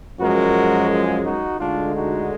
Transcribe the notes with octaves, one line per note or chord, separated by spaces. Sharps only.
F#2 F3 G#3 F#4 A#4
F4 G#4
D#4 F#4
D2 D3 G#3 D4 F4
D#4 F#4